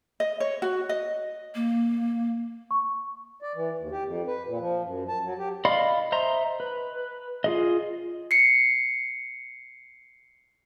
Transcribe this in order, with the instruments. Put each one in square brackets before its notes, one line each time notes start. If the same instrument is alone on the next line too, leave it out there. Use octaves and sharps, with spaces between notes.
[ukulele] D#5
C#5
F#4
D#5
[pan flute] A#3
[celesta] C#6
[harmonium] D5
E3
D#2
G4
F2
B4
A#2
F3
F#2
A5
F#3
G4
[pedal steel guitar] D5 D#5 F5 B5 C6
C5 D#5 E5 A#5 C6
B4
F4 G#4 D#5
[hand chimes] C7 C#7